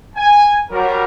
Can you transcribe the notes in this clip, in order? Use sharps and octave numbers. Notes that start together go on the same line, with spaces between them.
G#5
F#3 G3 A#4